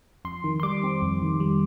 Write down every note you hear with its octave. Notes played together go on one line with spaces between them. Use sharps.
F2 C6
D#3
C6
G3 D6
C4
F2
D#3
G3